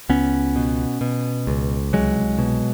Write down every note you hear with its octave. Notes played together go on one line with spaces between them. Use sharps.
C#2 B3 C#4
B2
B2
C#2
C2 F#3 G#3
B2